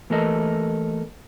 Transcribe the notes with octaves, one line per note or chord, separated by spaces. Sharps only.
E3 A3 A#3 A4 A#4 D#5